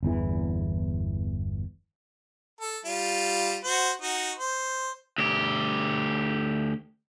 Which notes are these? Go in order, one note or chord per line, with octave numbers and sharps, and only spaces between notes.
G1 E2 E3
A4
G3 F4
F#4 C5
D#4 F#4
C5
D2 G4